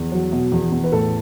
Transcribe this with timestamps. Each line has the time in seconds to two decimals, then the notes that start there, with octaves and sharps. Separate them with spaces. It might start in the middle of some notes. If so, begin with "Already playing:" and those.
Already playing: E2
0.12 F#3
0.32 B2
0.52 E2
0.72 E2
0.84 B4
0.92 A2 A4